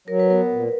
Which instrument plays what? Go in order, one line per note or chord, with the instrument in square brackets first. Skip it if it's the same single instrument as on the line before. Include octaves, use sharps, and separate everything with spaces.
[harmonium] F#3 [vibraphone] A#4
[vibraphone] B4
[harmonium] B3 [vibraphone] A#4
[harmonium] A#2